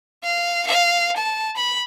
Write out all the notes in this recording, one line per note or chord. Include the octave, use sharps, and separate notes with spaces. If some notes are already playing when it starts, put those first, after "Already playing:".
F5
F5
A5
B5